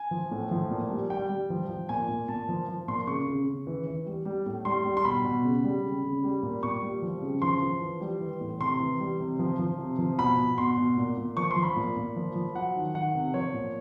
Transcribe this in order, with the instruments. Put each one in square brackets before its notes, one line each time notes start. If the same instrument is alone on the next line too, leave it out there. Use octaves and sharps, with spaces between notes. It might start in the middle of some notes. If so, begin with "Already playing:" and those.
Already playing: [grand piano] G#5
F3
A2
F3
A#2
G3
G3 G5
G3
F3
F3
A#2 G#5
A#2
A#2 A5
F3
F3
A#2 C6
C#3 C#6
C#3
C#3
E3
E3
G3
G3
A2
G3 C6
G3
C6
B2 B5
B2
C#3
G3
C#3
C#3
G3
A#2
A#2 C#6
G3
F3
C#3
F3 C6
F3
E3
G3
E3
A2
C3 C6
E3
G3
C3
F3
F3
C3
F3
B2 B5
B2
B2 C6
B2
A#2
A#2
F3 C#6
C6
F3
B5
A#2
A#2
F3
F3
F#3 F#5
D#3
D#3 F#5
C3
F3 C#5
A#2